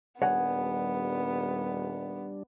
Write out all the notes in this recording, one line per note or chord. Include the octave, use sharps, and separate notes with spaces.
D#1 G3 B3 D4 C#5 F#5 G#5